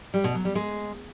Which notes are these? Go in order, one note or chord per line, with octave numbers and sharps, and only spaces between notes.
G3
B2
F#3
G3
G#3